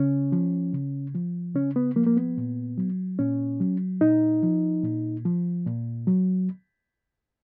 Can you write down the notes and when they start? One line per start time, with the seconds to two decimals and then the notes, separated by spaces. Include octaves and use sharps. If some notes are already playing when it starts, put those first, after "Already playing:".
Already playing: C#3 C#4
0.32 F3
0.73 C#3
1.14 F3
1.55 C#3 C#4
1.76 B3
1.96 F3 A#3
2.07 A#3
2.17 B3
2.38 A#2
2.78 F#3
3.19 A#2 C#4
3.60 F#3
4.01 A#2 D#4
4.43 F3
4.83 A#2
5.25 F3
5.66 A#2
6.07 F#3